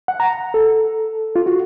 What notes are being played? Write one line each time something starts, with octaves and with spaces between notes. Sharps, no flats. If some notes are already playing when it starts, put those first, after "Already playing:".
F#5
A#5
A4
F4
F#4